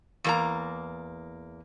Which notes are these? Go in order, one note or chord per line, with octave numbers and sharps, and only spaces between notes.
E2 A#3 A#5